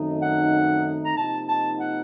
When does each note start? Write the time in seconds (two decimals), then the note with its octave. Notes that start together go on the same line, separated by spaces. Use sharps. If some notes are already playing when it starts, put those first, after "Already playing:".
Already playing: F#2 D#3 A3 C4 D#4
0.22 F#5
1.05 A#5
1.17 C3 F3 A#3 D#4 A5
1.49 A5
1.80 F#5